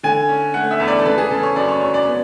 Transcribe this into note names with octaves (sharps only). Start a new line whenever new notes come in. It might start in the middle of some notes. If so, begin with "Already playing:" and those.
D3 G#5
C#4
A3 F#5
E5
E2
D5
A4
C#3 B4
G#4
C#3 A4
C#5
F#2 D5
C#5
F#2 C#5
D5
B3